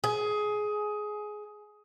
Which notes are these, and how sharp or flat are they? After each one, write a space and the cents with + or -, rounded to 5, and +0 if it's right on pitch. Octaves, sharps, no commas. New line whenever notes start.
G#4 +15